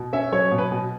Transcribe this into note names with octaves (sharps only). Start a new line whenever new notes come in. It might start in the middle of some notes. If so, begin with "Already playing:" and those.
Already playing: B2
C#4 E5
F#3 C#5
B2
B4
B2